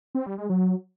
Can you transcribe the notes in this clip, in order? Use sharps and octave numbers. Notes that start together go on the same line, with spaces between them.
C4
G3
G#3
F#3